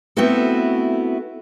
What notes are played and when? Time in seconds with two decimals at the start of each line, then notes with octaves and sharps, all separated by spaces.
0.17 A3 B3 C4 E4 F#4 A4